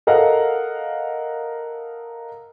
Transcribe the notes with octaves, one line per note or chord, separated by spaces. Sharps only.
A4 A#4 D#5 F5 F#5